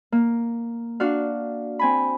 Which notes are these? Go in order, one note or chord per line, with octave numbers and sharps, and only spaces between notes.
A#3
D4 F#4 F5
C4 G#5 B5